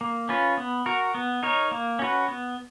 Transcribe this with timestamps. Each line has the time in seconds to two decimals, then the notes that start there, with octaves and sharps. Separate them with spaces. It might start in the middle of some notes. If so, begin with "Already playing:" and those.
0.01 A#3
0.29 C#4 F4 B4
0.57 B3
0.86 F#4 A#4
1.15 B3
1.43 D#4 A#4 C#5
1.71 A#3
1.99 C#4 F#4 B4
2.28 B3